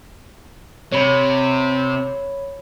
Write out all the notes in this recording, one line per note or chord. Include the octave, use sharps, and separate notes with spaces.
C3 C#5 B5